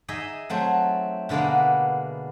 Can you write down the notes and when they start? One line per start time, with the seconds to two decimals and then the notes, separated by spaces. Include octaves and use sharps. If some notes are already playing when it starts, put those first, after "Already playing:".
0.08 D#4 G#4 D#5 E5
0.50 F#3 A3 C4
1.29 B2 D3 G#3 A#3 B3